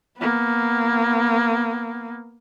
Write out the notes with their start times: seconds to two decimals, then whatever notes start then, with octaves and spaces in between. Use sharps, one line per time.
0.18 A#3 B3